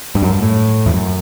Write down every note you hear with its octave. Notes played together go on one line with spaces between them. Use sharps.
G2
F#2
G2
A2
E2
F#2